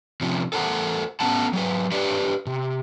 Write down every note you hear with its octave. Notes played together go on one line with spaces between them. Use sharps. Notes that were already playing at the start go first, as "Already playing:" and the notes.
C3 F3 C#4
A4 A#4 C5 F#5
A3 B3 C#4 F#5 A5
F#3 G#4 B4
G4 B4 C#5 D5
C3